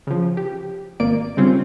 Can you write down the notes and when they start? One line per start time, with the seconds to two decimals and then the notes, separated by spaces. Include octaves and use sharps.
0.07 C#3 F3
0.37 G4
1.00 G#1 A#3 D5 D7
1.37 C#3 G3 C4 C#4 F4